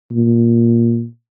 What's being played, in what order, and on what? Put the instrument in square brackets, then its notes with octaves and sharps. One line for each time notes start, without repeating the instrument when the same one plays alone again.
[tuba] A#2